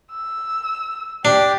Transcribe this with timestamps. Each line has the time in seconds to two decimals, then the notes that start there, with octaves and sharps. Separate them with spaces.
0.13 E6
1.25 D4 G4